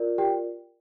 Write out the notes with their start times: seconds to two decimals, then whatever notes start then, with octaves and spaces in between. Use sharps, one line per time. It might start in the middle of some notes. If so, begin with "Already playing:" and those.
Already playing: F4 A#4 D5
0.18 G4 G5